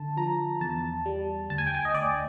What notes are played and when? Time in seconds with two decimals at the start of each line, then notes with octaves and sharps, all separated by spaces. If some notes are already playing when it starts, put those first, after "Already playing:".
Already playing: D3 A5
0.17 F3 A#5
0.61 E2 A5
1.06 G3
1.50 D2 A5
1.58 G#5
1.66 G5
1.75 G#5
1.85 D#5
1.94 D2 D5